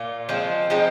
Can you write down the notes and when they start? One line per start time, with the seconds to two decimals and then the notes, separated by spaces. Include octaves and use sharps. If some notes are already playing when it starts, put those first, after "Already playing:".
Already playing: A#2 F4
0.29 F3 G#3 C4
0.70 F3 G#3 C4 D#4